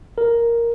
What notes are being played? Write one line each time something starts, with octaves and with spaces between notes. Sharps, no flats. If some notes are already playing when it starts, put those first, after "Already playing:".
A#4